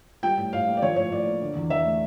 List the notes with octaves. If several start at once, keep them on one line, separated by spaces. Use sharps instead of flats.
G3 G5
A2
A2 F5
A#3
D5
F3 C#5
A2 C#5
A2 D5
A#3
D3
E2
E2 E5
A3